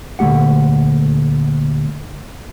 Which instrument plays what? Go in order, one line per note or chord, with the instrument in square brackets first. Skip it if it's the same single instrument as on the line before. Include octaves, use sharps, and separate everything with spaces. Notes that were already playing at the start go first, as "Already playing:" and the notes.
[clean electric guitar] D2 A#2 A3 G4 F#5